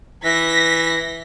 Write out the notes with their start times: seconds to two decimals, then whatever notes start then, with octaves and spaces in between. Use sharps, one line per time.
0.25 E3 A#6 B6